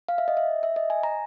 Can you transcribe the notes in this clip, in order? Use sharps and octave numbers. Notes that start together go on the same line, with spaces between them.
F5
E5
D#5
E5
E5
D#5
G#5
A#5